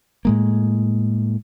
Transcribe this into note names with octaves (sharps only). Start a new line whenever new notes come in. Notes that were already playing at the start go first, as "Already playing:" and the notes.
A2 G#3 A#3